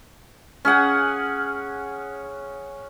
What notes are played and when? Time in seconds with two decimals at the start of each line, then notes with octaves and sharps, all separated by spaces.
0.65 C#4 G#4 F#5 G#5